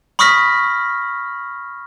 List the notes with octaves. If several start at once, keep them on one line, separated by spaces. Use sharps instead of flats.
B5 C#6 D#6 F6 A#6 B6